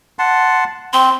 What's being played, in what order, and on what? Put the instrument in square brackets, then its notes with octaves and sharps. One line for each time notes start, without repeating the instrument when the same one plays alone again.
[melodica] F#5 A5 C6
[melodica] C4 [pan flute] C6